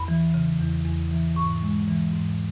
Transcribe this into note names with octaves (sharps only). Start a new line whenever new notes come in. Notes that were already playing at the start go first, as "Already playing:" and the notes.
Already playing: E2 B5
E3
C#3
E2
E2
E3
G#2 C#6
G#3
E3
G#2